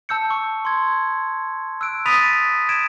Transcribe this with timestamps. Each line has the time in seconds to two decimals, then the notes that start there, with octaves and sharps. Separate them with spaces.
0.09 A5 E6 G6 C#7
0.30 C#6
0.65 C6 G#6
1.81 E6 F#6 D7
2.05 B5 D#6 A6 B6 D#7 F7
2.69 G#6 D7 E7